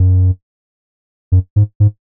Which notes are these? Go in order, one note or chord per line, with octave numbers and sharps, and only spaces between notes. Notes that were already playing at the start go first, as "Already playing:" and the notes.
Already playing: F#2
F#2
G#2
G#2